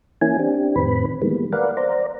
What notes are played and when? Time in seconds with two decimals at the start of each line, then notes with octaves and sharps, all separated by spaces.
0.21 E3 A#3 C#4 E4 G#5
0.39 C4 D4 G4
0.76 F2 A2 D#3 C4 B4 B5
1.22 D#3 E3 G3 G#3 A#3 B3
1.53 A#4 B4 D5 F5 F#5
1.77 C5 D5 A#5